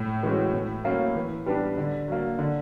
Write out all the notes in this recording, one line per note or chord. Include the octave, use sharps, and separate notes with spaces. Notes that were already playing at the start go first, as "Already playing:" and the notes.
Already playing: A2
E3 G#3 C#4 F#4
A2
F#3 A#3 C#4
E3
G3 B3 D4 G4
D3
F#3 A#3
D3